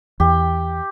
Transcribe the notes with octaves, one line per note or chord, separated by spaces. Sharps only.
E2 G4